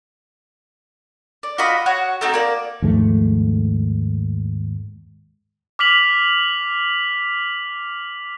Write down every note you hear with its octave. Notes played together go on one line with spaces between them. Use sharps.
D5
F4 F#4 D#5 B5
F#4 C#5 F#5
A3 C4 D#4 F#4
A#3 D5
D#2 G#2 F3 A3
D6 F6 B6 F7 F#7